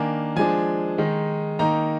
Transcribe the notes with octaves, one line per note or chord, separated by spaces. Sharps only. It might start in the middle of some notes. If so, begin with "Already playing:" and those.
Already playing: D#3 A#3 D4 G#5
F3 G#3 D4 G#5
D#3 G#3 D#4
D#3 A#3 D#4 A#5